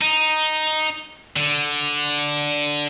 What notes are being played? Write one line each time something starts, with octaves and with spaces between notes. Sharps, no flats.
D#4
D3